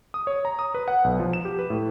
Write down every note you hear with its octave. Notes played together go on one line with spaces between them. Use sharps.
D#6
C#5
A#5
D#6
B4
F#5
B1
F3
E7
G4
B4
A2